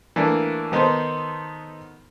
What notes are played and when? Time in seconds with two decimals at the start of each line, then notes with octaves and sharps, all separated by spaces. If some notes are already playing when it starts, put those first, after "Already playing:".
0.16 E3 A3 A#3 D4
0.72 D#3 B3 D#4 A4 C5